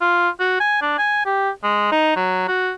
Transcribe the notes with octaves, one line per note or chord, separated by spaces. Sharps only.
F4
F#4
G#5
D4
G#5
G4
G#3
D#4
F#3
F#4